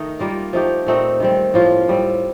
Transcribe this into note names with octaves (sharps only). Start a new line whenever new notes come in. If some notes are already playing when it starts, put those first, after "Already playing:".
Already playing: D#3 A3 D#4
G3 A#3 F4 A#4
F3 A3 D#4 G4
A#2 A3 C4 D#4
D#3 G3 C4
A2 F3 A#3 F4
A2 G3 C4